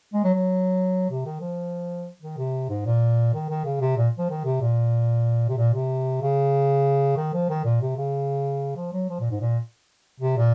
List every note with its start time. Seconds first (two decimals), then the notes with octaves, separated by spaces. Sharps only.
0.14 G#3
0.24 F#3
0.34 F#3
1.10 C3
1.26 D#3
1.41 F3
2.22 D#3
2.38 C3
2.69 G#2
2.86 A#2
3.34 D#3
3.50 D#3
3.65 C#3
3.81 C3
3.97 A#2
4.18 F3
4.30 D#3
4.45 C3
4.61 A#2
5.49 C3
5.57 A#2
5.74 C3
6.22 C#3
7.17 D#3
7.34 F3
7.50 D#3
7.65 A#2
7.82 C3
7.97 C#3
8.76 F3
8.93 F#3
9.09 F3
9.20 A#2
9.31 G#2
9.41 A#2
10.20 C3
10.37 A#2